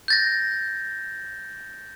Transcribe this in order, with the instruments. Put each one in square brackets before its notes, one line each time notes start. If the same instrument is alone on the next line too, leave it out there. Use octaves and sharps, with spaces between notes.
[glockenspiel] G6 A6 A#6